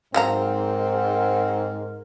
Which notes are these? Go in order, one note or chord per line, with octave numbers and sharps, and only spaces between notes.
G#2 F#3 C4 A#4 F5 A#5